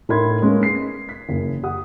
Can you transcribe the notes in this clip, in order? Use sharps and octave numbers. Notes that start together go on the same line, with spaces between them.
A2 D#4 A#4 B5 C6 G#6
G#3 A#3 B3 C#4
C7
B6
F#1
G4 F#5 D#6